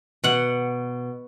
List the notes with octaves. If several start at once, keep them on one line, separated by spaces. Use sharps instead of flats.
B2 F#5